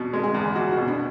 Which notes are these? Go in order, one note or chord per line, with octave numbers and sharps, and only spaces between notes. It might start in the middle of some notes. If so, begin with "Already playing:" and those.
Already playing: E2 B2
G#3
G#4
E2
E2 F#4
F#4
B2
D4